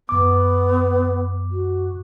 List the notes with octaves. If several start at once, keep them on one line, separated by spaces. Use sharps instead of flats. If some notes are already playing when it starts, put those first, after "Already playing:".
F#2 B3 D6
F#4